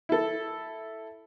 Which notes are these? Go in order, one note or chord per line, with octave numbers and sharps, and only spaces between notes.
E4 A4